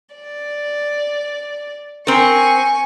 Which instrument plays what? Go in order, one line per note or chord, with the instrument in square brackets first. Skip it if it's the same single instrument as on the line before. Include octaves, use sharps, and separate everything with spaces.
[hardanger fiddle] D5
[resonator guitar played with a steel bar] C4 A#4 [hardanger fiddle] G#5 C#6